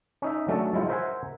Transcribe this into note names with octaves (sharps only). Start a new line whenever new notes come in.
C#4 D#4 E5
F#3 A3 C#4 D4 A4 A5
F#3 G#3 E4 F4 G5
A#4 C5 E5 F#5 G#5